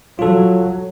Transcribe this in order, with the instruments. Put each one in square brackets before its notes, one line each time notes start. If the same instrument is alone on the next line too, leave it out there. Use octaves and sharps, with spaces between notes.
[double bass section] F#3 [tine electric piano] F4 A4